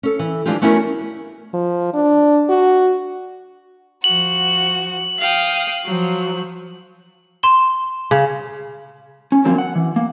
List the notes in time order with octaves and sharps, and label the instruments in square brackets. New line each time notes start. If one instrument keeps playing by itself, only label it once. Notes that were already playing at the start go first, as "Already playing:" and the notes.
[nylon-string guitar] C#4 A4
E3
E3 F3 G#3 D4 F4 G4
A3 B3 C#4 E4 F#4 A#4
[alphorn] F3
D4
F#4
[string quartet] F3 F#4 [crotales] F#7
[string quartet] F5 G5 D#6
F3 F#3
[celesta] C6 E7 G7
[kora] C#3
[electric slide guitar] C#4
D3 F3 F#3 A#3 C4
F#5
E3
A#3